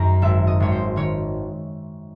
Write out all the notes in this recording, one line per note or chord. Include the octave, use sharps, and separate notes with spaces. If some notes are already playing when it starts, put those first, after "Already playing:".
Already playing: F#2 D#3 A#5
G#1 E5
D#5
G#1 C#5
C5
D#3 C#5